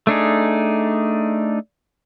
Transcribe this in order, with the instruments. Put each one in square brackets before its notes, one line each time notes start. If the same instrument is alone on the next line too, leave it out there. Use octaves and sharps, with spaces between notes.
[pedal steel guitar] A3 D4 D#4 G#4